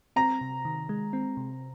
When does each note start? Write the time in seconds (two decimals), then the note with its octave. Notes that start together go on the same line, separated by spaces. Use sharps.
0.16 C4 A#5
0.41 C3
0.65 D#3
0.89 G#3
1.13 C4
1.37 C3